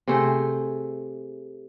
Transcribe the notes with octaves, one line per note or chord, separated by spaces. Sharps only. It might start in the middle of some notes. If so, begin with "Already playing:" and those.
C3 A3 G#4 C5